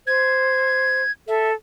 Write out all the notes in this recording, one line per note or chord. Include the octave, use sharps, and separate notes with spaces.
C5 G#6
A4 E5